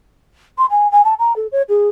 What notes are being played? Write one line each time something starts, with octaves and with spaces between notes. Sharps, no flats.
C6
G#5
G#5
A5
A#5
A4
C#5
G#4